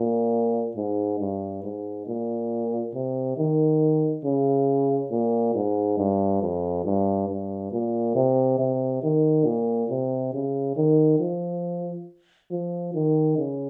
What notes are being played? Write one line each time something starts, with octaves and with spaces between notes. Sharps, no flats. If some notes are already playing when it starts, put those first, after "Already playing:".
Already playing: A#2
G#2
G2
G#2
A#2
C3
D#3
C#3
A#2
G#2
G2
F2
G2
G2
A#2
C3
C3
D#3
A#2
C3
C#3
D#3
F3
F3
D#3
C#3